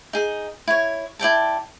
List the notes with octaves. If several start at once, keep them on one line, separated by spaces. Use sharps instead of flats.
D#4 G#4
E4 C#5
E4 D5 G5 A5